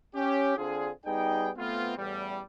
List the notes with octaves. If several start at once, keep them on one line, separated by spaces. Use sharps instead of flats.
C#4 G4
D3 C4 D4 F4 G#4
G3 B3 D#4 G#4 G5
A3 B3 C4 F4
A1 E2 G3